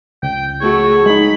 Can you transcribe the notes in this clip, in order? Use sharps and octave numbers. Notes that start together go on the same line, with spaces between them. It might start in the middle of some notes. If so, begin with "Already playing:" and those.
C#2 G5
A3 F#4 G#4 C#5
G#3 D#4 B5